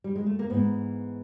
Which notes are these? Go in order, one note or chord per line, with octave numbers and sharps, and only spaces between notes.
G3
G#3
A3
A#3
G#2 E3 B3